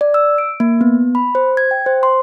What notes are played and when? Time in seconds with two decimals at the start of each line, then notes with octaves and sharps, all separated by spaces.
0.01 D5
0.14 E6
0.38 D7
0.60 A#3
0.81 B3
1.15 B5
1.35 C5
1.57 G#6
1.71 G5
1.86 C5
2.03 C6